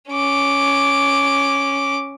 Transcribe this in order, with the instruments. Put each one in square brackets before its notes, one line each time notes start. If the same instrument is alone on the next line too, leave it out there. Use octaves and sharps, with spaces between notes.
[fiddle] C#4 D6